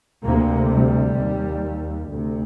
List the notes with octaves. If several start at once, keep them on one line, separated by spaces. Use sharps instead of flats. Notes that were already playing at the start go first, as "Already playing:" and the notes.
D2 C3 A#3
G3
D#2
D2 C3